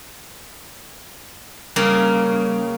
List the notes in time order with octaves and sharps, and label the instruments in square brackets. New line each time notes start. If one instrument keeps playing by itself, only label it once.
[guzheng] C#3 A#3 [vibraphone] G3